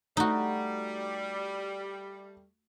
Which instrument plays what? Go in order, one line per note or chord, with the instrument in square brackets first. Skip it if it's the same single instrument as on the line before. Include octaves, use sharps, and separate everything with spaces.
[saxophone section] G3 [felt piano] A3 [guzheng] D#4 F#4